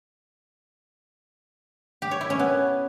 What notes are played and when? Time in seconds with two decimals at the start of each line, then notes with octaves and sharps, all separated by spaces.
2.02 G4
2.11 C#5
2.21 E4
2.30 C#4
2.39 B3